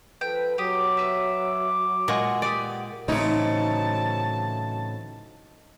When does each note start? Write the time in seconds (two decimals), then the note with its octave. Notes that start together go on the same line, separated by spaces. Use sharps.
0.21 F3 A4 B4 G5
0.58 F#3 G4 D6 D#6
0.97 B4 E5
2.08 A#2 G#3 F#4 C#6
2.42 B3 G4 D5 D#6
3.08 A2 C#3 E3 F#3 A3 C4 D#4 A5